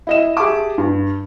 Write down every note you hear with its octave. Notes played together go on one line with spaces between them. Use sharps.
E4 D#5 E7
G4 G#4 E5 A5 D6
G2